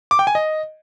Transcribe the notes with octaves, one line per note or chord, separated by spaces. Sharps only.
D6
G5
G#5
D#5